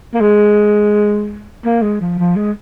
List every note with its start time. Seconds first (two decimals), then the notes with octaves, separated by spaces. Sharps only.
0.14 A#3
0.21 G#3
1.65 A#3
1.82 G#3
2.01 F3
2.19 F3
2.36 G#3